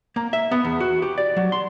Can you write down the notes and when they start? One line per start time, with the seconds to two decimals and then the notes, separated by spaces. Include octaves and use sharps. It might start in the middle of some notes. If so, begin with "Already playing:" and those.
0.16 A#3
0.33 E5
0.51 B3
0.65 E2
0.80 F#4
1.02 G4
1.18 D5
1.36 F#3
1.52 C6